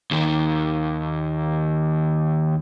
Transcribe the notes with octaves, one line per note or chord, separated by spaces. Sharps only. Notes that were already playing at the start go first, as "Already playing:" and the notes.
D#2 D#3